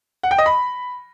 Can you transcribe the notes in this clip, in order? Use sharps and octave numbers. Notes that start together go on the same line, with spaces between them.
F#5
G5
D#5
B5